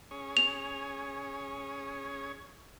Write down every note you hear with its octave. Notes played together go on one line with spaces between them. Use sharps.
C#4 G#4 C#5
F7